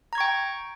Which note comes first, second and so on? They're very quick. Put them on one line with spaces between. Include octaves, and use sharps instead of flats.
A#5 G#6 C#6 G5